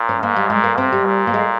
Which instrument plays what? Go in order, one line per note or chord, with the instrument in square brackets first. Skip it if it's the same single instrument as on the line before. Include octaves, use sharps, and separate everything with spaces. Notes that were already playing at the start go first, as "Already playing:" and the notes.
Already playing: [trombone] A#2
[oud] C#4
[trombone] G#2 [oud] A#3
[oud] G3
[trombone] A#2 [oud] G#3
[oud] A#3
[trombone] C3 [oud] C4
[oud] G3
[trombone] A#2
[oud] A#3
G#3